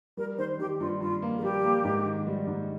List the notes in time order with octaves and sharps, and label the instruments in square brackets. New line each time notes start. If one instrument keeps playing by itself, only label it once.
[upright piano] G3 [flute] A#4
[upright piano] D#3 [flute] C5
[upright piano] D#3 [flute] G4
[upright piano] G2 [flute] F4
[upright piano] G2 [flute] F4
[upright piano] A#3
[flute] G#4
[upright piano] G3 [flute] G4
[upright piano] A#3
G#2
D#3
G3
G#2